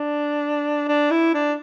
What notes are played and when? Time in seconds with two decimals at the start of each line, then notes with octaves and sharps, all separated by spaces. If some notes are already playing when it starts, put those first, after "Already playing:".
Already playing: D4
0.88 D4
1.11 E4
1.34 D4